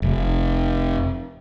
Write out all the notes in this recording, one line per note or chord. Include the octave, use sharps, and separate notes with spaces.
F1